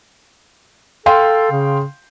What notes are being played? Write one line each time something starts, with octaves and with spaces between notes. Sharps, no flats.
A4 F5 G5 C6
C#3